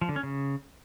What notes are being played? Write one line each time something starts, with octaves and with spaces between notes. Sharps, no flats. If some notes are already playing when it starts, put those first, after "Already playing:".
F3
D3
C#4
C#3